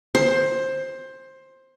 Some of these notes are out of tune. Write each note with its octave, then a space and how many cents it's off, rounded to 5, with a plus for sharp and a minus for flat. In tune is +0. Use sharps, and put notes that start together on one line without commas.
C5 +15